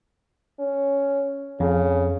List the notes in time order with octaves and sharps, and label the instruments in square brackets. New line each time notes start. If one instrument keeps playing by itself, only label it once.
[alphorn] C#4
[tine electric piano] F2 [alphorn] C#3